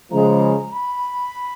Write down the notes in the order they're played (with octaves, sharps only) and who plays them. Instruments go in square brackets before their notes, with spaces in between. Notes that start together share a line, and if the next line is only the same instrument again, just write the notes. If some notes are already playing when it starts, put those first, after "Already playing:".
[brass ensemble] C#3 F3 G#3 [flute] A#5
[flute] B5